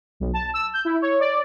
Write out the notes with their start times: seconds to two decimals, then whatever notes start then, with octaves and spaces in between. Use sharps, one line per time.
0.20 B1
0.33 A5
0.54 E6
0.73 G6
0.85 E4
1.02 C#5
1.20 D5